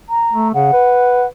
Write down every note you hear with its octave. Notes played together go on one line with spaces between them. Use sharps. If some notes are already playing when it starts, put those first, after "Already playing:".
A#5
A3
C#3 F#5
B4